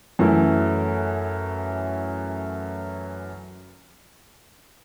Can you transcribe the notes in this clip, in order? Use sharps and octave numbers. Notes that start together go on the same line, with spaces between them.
F#2 E3 A3 E4